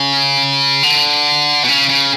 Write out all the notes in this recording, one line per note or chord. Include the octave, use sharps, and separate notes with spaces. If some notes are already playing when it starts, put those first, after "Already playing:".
Already playing: C#3
D3
B2
C#3
C#3